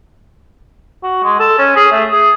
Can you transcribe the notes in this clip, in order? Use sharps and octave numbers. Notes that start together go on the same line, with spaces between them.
F#4
G#3
A4
C#4
G#4
A3
G#4